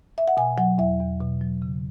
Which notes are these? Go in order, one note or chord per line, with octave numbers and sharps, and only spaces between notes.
E5
F#5
B2 G#5
F#3 F#5
E2 E5
E2
B2
F#3
C#3